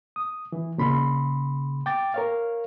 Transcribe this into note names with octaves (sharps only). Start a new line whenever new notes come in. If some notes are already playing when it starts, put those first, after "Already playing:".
D#6
E3
A#2 C#3 B5 C6
G5 D6 A6
A#4 C#5 F5